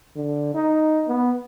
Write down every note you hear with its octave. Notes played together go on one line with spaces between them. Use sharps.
D3
D#4
B3